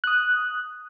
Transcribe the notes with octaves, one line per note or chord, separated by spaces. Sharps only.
D#6 F#6